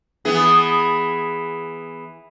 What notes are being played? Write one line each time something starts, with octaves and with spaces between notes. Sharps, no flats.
E3 B3 G#4